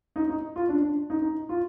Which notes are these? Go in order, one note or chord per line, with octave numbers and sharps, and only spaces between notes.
D#4
D#4
F4
D4
D4
D#4
D#4
F4